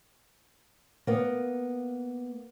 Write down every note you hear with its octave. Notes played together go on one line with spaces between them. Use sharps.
A#3 B3